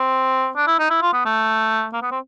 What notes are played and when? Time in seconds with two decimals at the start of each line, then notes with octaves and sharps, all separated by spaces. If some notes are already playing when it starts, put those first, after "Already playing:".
Already playing: C4
0.56 D4
0.67 E4
0.79 D#4
0.90 E4
1.02 F4
1.13 B3
1.25 A3
1.93 A#3
2.02 B3
2.11 C4